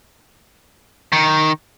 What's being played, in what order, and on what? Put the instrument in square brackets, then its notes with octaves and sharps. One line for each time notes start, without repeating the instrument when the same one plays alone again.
[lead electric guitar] D#3